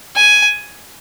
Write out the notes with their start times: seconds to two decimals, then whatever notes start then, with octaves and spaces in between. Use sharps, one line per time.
0.16 G#5